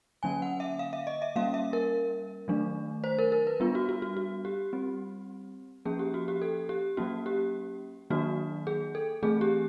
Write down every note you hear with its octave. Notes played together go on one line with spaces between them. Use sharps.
D3 F#3 A#3 C#4 G#5
F#5
E5
F5
E5
D#5
E5
G3 A#3 C#4 F5
E5
A#4
D#3 F#3 A3 D4
C5
A#4
A#4
B4
G3 B3 D4 F4
F#4
F#4
F#4
F#4
G4
G3 C4
F3 A#3 C#4 G#4
G4
F#4
G4
A4
G4
F#3 A#3 C#4 F#4
G4
D#3 F#3 A#3 D4 F#4
G#4
A4
E3 A3 C4 G#4
G4